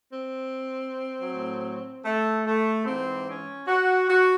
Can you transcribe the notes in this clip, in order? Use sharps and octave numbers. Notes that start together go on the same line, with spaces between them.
C4
A2 F#3
A3
A3
G#2 E3 C4
C#4
F#4
F#4